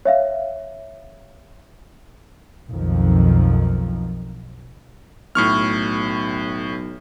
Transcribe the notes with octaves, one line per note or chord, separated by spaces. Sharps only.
C#5 E5 F5
B1 F2 B2 D#3 F3
B1 A2 C#6 F6